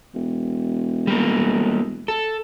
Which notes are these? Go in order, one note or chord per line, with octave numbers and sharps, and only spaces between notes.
E1
G3 A#3
A4